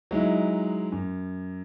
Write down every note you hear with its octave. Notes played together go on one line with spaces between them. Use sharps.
F#3 G#3 D#4 E4
F#2